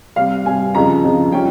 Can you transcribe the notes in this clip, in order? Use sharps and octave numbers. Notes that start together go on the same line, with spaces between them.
C3 G3 C4 F5
C3 G3 C4 G#5
F2 C#3 F3 A#5
F2 C#3 F3
G3 C#4 F4 G5